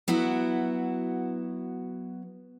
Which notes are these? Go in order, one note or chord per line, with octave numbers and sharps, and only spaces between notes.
F#3 B3 E4 F#4